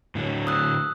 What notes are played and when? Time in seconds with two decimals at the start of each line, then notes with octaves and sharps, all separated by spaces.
0.15 A2 D3 F#3
0.47 D#6 E6 F#6